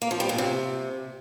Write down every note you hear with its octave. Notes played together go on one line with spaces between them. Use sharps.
A#3
F3
G3
A#2
C3